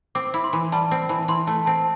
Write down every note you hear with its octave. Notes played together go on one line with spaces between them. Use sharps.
C4 D6
E4
C6
E3
G3 A5
C4
E3
E3 C6
A3 A5
C4 A5